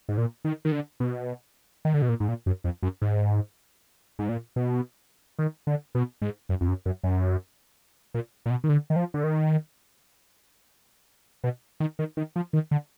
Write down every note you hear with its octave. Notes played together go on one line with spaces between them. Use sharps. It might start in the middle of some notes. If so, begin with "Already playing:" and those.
G#2
A#2
D#3
D#3
D3
B2
D#3
D3
B2
A#2
G#2
A#2
F#2
F2
F#2
G#2
G#2
A#2
B2
D#3
D3
B2
G#2
F#2
F2
F#2
F#2
F#2
A#2
A#2
B2
D#3
D3
D#3
F3
D3
D#3
B2
D#3
D#3
D#3
F3
D#3
D3